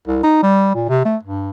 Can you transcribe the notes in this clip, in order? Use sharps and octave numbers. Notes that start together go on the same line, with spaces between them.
C2
D#4
G3
A#2
C3
A3
G2